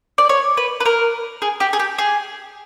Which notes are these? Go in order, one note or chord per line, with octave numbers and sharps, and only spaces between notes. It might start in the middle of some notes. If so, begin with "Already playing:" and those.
D5
C#5
B4
B4
A#4
G#4
G4
G#4
G4
G#4